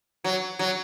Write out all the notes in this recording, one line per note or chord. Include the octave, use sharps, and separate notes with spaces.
F#3
F#3